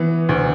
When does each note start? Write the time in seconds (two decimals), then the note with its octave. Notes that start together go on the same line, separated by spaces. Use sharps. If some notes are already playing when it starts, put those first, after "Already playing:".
Already playing: E3 B3
0.29 D2